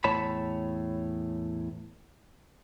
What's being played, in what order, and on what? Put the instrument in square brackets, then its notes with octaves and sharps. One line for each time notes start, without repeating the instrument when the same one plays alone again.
[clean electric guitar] E2 A2 C#5 A5 B5